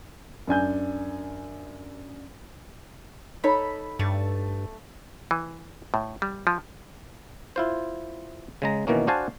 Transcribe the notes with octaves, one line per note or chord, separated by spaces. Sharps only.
F#2 D4 G#5 G6
D#4 A4 C#5 B5
G2 A3 A5
E3
A2
G3
F3
E4 F4 C5
C#3 G#3 A#5
B2 D#3 E3 A#3 C#4
D4 F#4 C5 F5 G#5 A5